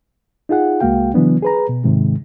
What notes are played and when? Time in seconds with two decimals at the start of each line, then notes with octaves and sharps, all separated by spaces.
0.49 D#4 F4 G#4 F#5
0.81 C2 G#3 A#3 F#4 F5 G5
1.14 C#3 E3 F#3 B3 D4
1.42 G#4 B4 A#5
1.69 B2
1.84 G#2 C3 D#3 G#3